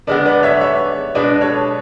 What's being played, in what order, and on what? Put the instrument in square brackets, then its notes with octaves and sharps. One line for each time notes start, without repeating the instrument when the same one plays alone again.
[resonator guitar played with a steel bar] D3 G#3 B3 [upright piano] B4 D5
[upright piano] B4 D5
C#5 E5
C#5 E5
[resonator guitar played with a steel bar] B2 G#3 D4 [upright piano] B4 D5
[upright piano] A4 C#5